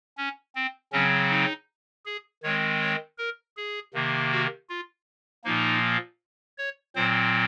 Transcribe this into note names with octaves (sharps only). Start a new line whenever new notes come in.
C#4
C4
C#3 F#3 C4 C#4
D#4
G#4
D#3 G#3 C4 C#5
C#5
A#4
G#4
C3 D#3 A#3
F#4
F4
A#2 F3 A#3 D#4
C#5
A#2 F#3 C4 C5